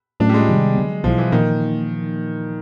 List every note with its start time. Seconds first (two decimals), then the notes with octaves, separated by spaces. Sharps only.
0.20 A2 F#3 A3 C#4 D4 F4
0.29 G3
0.34 G#3
0.48 C3 D#3 G3 B3
0.75 D3 F#3 B3
1.04 B1 B2 F3 F#3 B3 E4
1.18 E3
1.32 A#2 D#3 F3 A#3 D#4